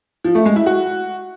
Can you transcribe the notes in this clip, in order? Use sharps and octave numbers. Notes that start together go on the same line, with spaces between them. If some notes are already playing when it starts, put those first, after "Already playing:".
F3
A3
G#3
E4
F#4